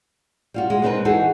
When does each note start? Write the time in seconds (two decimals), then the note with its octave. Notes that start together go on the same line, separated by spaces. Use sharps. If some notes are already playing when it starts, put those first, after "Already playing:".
0.54 G3 F4 F#4
0.70 G#3
0.82 G#3 B3 C4 D#4 A#4 B4
1.05 E3 D#4 F#4 G#4 A4